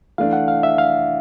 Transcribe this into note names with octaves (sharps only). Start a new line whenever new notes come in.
E3 A3 D4 F5
F#5
F5
E5
F5